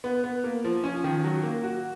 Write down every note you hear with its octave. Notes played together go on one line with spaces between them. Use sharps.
B3
B3
A#3
F3
C#4
D#3
F#3
A#3
F#4